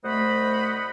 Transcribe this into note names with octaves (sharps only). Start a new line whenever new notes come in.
C2 A3 C5 D#5 F#5 B5